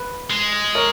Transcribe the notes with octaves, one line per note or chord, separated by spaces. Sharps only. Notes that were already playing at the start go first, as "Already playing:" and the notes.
Already playing: B4
G#3
A#4 C#5